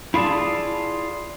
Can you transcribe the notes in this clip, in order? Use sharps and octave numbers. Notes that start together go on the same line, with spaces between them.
E4 F4 G#4 D5 A5